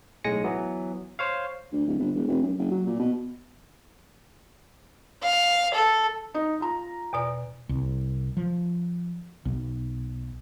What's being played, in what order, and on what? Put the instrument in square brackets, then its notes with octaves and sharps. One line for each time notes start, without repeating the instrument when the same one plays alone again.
[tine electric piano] B1 A2 G#3 G#5 A#6 C#7
E3 F#3 B3
C5 C#5 F5
[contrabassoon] D2
D1
G1
E1
F1
F#2
F#1
F#3
A#2
B2
[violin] F5
A4
[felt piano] D#4
F4 A#5
[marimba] E2 B2 D5
[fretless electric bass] C2
F3
B1